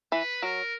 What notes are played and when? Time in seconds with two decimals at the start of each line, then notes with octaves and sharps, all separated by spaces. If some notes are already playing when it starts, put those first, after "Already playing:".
0.12 E3 B4
0.42 F#3 A#4